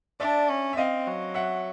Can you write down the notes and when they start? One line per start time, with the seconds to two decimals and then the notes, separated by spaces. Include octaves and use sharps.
0.20 D4 D5 E5
0.49 C#4
0.73 E5
0.77 C4 D#5 F5
1.07 F#3
1.34 E5 F#5